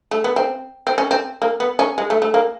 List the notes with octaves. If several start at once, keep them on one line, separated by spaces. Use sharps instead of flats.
A3
B3
C4
C4
C#4
C4
A#3
B3
C#4
G#3
A3
A3
A#3